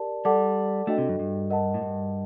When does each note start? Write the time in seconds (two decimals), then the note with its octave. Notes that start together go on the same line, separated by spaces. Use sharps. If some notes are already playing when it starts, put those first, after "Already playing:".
Already playing: G4 A#4 D5 A5
0.25 G3 A4 D5 F#5 A5 D6
0.87 A3 D4 F#4 A4 D#5 G5
0.98 C3
1.09 F#2
1.19 G2
1.50 A#4 D#5 F#5 A5
1.74 A2
1.81 G2